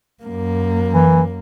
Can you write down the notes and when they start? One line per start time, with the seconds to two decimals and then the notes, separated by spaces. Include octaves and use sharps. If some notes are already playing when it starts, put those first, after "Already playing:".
0.23 F#2 A#3
0.93 E3